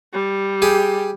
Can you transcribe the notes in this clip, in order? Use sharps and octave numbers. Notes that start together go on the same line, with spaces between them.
G3
G4 G#4